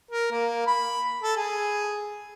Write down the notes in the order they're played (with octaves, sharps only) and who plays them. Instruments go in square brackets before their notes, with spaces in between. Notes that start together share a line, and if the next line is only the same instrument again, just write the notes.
[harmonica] A#4
A#3
B5
A4
G#4